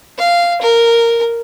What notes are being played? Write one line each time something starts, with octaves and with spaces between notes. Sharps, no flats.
F5
A#4